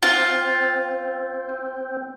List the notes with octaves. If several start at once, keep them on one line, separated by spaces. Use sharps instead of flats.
C4 F4